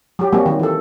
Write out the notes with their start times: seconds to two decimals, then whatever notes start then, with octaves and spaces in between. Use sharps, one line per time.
0.19 F#3 G4
0.32 F#3 G3 A#3 C4 F#4
0.46 D#3 F#3
0.60 E3 A4